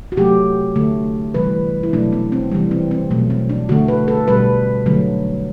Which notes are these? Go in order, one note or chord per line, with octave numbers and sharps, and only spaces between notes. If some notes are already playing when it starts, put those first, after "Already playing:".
F#4
C3 F#3 A3 G4
D3 A3
C3 E3 G3 B4
E4
B2 F#3 A3 D4
B3
C4
C3 E3 G3
C4
C4
B2 F#3 A3
C4
D4
D3 A3 F#4
B4
A4
B2 G3 B4
D3 F#3 A3